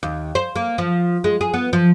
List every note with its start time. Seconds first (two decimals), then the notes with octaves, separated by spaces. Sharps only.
0.03 D#2
0.35 C5
0.56 A#3
0.78 F3
1.24 G#3
1.41 G#4
1.54 B3
1.73 F3